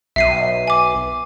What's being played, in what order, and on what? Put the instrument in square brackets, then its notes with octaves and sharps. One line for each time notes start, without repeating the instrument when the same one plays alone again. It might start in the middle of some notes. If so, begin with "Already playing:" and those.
[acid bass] B1 [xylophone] E5 C7 D#7
[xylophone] G#5 D6